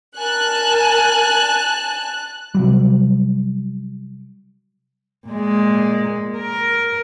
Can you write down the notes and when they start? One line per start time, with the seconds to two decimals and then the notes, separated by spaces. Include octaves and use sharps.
0.18 A#4 G#5 A5 F#6
2.55 C3 F#3 G3
5.27 A#2 G#3
6.38 A#4